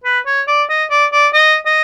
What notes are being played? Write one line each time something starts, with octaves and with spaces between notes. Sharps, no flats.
B4
C#5
D5
D#5
D5
D5
D#5
D#5